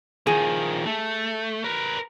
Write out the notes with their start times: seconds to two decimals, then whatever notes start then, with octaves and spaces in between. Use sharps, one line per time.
0.27 D#3 F3 G#4
0.86 A3
1.64 A#4 B4